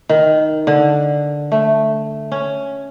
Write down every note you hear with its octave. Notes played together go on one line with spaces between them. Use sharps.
D#3
D3
A3
C#4